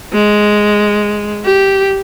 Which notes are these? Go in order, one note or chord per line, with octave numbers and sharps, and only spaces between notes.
G#3
G4